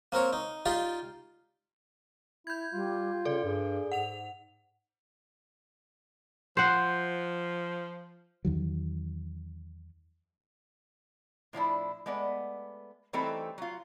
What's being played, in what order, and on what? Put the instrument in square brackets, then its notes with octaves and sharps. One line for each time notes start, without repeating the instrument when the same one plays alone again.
[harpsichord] A#3 C4 A#4 C#5
D#4
D#4 F4 G4 D5 F5
[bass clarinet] E4 [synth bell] G6 G#6
[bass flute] G3 [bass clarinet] F4
[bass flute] C#3 [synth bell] A4 D5
[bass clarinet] G2 [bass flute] G#4
[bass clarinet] G#2 [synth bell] F#5 F7
[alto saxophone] F3 [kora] C5 F#5
[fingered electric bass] E2 D#3 F#3
[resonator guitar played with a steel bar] A2 F3 D4 E4
G#3 A3 B3 D5
E3 G3 A3 C4 D#4 A4
F#3 F4